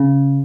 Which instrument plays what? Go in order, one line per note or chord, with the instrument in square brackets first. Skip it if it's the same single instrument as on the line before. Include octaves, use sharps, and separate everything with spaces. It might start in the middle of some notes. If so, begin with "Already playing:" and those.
Already playing: [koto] C#3